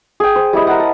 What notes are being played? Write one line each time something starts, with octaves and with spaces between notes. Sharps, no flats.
G#4 G5
C5
G3 E4 D#5
A#4 F#5
A5